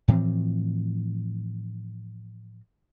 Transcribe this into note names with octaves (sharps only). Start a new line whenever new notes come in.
A2 E3 F3 C4